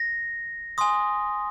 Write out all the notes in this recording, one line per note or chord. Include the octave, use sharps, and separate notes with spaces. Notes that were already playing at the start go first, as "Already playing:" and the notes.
Already playing: A#6
G#5 C6 D#6